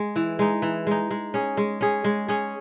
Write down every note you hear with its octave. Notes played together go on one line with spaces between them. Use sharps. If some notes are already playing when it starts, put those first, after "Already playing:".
Already playing: G#3
E3
G#3 D#4
E3
G#3 D#4
G#3
C#4 G#4
G#3
C#4 G#4
G#3
C#4 G#4